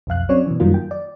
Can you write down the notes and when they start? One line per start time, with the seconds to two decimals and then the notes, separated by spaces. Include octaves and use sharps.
0.07 B1 F2 F5 F#6
0.29 F#3 C4 C#4 C#5 D5
0.47 B2 E3
0.60 F#2 D#3 F#3 G3 A#3 F4
0.74 G5
0.91 D5